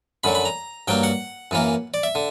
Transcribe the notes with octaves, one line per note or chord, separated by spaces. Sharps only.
F#2 D3 F#3 B5
B5
A#5
G2 F#3 A#3 G5
F#5
F#2 E3 A#3
D5
E5
D3